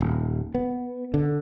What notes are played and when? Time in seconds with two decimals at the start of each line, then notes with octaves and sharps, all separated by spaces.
0.01 D#1
0.55 B3
1.14 D3